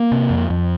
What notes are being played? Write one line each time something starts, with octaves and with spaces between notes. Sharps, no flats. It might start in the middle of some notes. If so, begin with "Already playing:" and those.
Already playing: A#3
C3
F2
F2